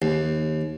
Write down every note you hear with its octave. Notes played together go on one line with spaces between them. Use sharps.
D#2